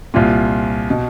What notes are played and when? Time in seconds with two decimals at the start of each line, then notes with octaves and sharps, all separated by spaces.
0.14 C2 A#2 F4
0.90 B2